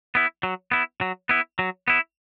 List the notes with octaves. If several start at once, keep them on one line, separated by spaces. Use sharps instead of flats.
B3 E4
F#3
B3 E4
F#3
B3 E4
F#3
B3 E4